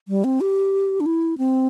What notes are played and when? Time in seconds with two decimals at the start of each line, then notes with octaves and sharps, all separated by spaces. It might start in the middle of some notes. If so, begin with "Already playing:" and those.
0.08 G3
0.24 C4
0.41 G4
1.00 D4
1.06 E4
1.38 C4